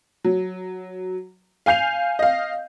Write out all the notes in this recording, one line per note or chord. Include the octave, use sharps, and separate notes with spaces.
F#3
F5 G#5 G6 C7 F7
D#5 F5